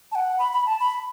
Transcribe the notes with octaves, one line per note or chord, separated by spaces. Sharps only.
A5
F#5
B5
B5
A5
B5